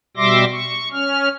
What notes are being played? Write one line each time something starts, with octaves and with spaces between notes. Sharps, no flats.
B2 G3 E5 C6 D6 A#6
C#6
C#4 F6